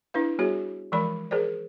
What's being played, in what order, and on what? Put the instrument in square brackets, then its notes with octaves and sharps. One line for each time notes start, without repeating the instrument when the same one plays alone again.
[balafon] D4 E4 B4 F5
G3 B3 F#4 G#4 C#5
E3 F3 G#3 A#4 D5 B5
G#4 A#4 C5 D5